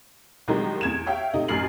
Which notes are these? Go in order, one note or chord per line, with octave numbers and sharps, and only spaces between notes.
C2 D#3 F#3 G#3
E2 G#6 E7
C#5 E5 F5 G5
C3 A3 D#4
A1 F#2 F6 C7 F#7